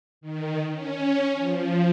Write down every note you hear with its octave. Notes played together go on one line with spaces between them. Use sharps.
D#3
C#4
F3